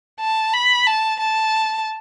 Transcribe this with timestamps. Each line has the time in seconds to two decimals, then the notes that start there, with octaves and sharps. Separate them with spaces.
0.20 A5
0.54 B5
0.87 A5
1.20 A5